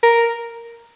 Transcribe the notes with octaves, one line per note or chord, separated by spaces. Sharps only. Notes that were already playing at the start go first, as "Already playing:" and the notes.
A#4